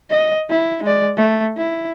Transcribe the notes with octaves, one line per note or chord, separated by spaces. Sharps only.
D#5
E4
G#3 D5
A3
E4